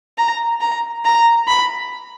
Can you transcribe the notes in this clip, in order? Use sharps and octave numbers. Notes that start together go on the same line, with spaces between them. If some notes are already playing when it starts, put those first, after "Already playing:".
A#5
A#5
A#5
B5